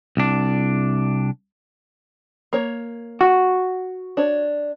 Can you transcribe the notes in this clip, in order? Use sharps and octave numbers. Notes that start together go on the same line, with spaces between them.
C2 D4
A#3 C#5
F#4
D4 C#5